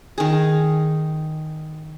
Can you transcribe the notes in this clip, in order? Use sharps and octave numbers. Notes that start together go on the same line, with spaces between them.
D#3 G#4